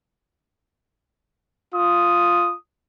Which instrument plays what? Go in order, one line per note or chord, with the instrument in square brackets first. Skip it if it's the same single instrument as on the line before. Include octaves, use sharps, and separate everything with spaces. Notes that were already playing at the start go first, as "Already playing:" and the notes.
[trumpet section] F4 D#6